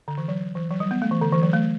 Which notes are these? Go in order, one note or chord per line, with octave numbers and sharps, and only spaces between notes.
D3
E3
F#3
E3
F#3
G3
B3
A3
E3
D3
E3
F#3
A3